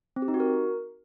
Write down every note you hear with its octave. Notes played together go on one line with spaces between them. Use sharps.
C4
G4
D#4
F#4
A#4